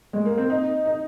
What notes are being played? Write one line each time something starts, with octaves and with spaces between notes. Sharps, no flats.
G#3
A#3
C4
D#4
D#4